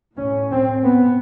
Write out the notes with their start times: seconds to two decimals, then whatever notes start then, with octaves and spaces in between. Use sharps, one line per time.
0.16 A2 C#4
0.51 C4
0.85 B3